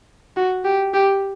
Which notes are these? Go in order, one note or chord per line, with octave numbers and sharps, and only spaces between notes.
F#4
G4
G4